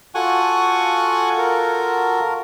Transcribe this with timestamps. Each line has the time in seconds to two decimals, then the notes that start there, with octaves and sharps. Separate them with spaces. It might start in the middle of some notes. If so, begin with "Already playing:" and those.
0.15 F4 F#4 A4 F#5 G#5 C#6
1.38 A#4